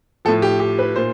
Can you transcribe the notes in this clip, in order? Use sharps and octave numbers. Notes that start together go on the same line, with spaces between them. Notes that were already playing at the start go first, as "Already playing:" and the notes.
A2 F3 A4
G4
G4
B4
A#2 C5